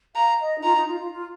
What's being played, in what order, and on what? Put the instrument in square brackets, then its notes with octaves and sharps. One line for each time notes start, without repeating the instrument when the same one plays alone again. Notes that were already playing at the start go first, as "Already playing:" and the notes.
[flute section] F5 [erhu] A#5
[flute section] D#5
D#4
[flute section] F4 [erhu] A#5
[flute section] D#4
F4
F4
F4